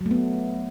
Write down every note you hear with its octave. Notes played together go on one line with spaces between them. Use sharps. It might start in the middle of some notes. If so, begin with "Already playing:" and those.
F#3
A3
B3